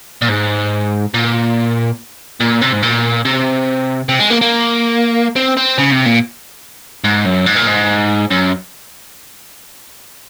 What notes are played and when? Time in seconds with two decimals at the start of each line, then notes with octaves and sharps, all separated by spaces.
0.22 A#2
0.29 G#2
1.14 A#2
2.40 A#2
2.62 C3
2.73 G#2
2.83 A#2
3.25 C3
4.09 C3
4.19 G#3
4.30 A#3
4.41 A#3
5.36 C4
5.57 C4
5.78 C#3
5.92 C3
6.06 A#2
7.04 G#2
7.25 F#2
7.46 G#2
7.56 A#2
7.67 G#2
8.31 F#2